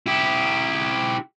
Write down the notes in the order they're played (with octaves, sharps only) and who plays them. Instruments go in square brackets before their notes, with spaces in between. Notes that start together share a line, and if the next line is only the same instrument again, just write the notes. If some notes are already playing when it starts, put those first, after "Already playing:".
[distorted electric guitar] E4 G4